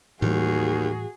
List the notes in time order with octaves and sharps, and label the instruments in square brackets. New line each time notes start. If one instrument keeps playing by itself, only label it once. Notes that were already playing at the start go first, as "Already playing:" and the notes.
[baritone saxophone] D#2 [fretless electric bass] A2 E3 G3 [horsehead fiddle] F#4 G#4